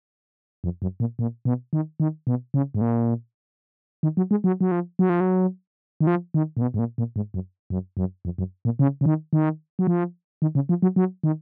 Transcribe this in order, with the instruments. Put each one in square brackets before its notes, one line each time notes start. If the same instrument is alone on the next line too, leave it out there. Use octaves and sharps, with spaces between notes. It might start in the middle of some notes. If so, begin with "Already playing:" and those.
[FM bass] F2
F#2
A#2
A#2
B2
D#3
D#3
B2
C#3
G#2
A#2
D#3
F#3
G#3
F#3
F#3
F3
F#3
F3
F#3
D#3
F3
D#3
A#2
B2
G#2
A#2
A#2
G#2
F#2
F#2
F#2
F2
F#2
A#2
C#3
C#3
D#3
D#3
F#3
F3
D#3
C#3
F3
F#3
F#3
D#3